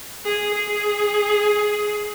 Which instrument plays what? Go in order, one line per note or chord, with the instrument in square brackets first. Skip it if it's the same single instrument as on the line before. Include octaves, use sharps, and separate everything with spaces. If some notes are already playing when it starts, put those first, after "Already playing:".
[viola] G#4
G#4